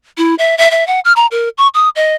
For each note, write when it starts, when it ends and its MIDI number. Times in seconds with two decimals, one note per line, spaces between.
0.18 0.35 64
0.39 0.55 76
0.58 0.70 76
0.71 0.86 76
0.87 1.00 78
1.05 1.12 89
1.16 1.26 82
1.31 1.49 70
1.58 1.68 85
1.74 1.89 87
1.96 2.16 75